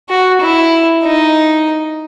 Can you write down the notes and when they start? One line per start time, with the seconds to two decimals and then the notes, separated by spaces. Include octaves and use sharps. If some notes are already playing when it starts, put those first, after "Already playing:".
0.09 F#4
0.41 E4
1.03 D#4